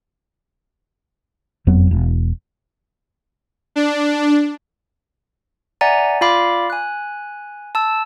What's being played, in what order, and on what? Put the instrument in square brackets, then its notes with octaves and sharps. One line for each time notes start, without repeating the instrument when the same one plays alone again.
[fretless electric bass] F#1 F2 F#3 B3
E1
[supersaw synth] D4
[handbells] D5 E5 F#5 G#5 A#5
F4 D5 F5 B5 D6
G#5 F#6
A5 E6